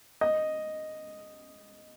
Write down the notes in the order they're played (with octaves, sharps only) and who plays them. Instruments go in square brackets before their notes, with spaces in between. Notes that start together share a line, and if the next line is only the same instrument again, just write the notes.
[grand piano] D#5